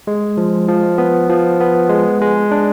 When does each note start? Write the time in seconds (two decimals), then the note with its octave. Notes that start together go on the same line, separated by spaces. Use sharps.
0.07 G#3
0.37 F3
0.69 F3
0.98 B3
1.30 F3
1.60 B3
1.90 G#3
2.21 G#3
2.51 D4